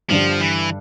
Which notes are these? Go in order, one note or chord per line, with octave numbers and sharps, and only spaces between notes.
G2 D3 F3 G3
E3